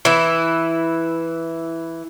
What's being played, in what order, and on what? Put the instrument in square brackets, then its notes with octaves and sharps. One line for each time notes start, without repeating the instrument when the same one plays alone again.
[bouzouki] E3 E4